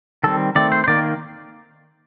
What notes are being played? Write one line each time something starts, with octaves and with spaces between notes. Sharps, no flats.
D#3 G3 C4 A4
D#3 A3 C4 D5
C5
C5
D#3 A#3 D5